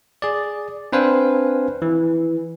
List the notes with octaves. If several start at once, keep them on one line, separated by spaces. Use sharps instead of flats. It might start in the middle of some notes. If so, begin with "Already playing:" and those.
G#4 D5
C4 D4 B4 C5 F5 G#5
E3